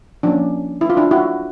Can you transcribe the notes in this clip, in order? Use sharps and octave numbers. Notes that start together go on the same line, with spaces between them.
F3 A#3 C#4 D4
E4
F4
D4 E4
E4 F#4